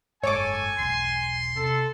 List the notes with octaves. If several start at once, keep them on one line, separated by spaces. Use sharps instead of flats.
F#1 G#2 A4 C#5 G#5 C#6 D6
E1 B1 C6
C3 A4